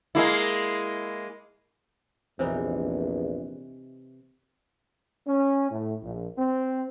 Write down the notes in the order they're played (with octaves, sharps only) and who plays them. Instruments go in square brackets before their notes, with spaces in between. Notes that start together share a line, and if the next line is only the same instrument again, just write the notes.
[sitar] G#3 A#3 E4
[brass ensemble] A#1 E2 [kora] C3 E3 D#4
[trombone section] C#4
A2
A#1
C4